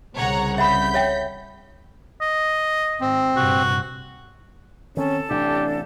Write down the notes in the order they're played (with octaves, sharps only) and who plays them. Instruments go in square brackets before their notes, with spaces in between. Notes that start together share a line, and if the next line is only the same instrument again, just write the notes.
[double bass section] C2 C#3 [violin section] C#5 F#5 A#5
[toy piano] E5 F#5 B5 [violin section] G6 B6
[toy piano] C#5 E5 G5
[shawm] D#5
[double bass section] G#1 [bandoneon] C4
[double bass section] A#1 G2 C3 [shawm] F#4
[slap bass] D#3 C4 [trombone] C#4 [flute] A4
[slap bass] A1 C3 [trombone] D4 [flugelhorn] G4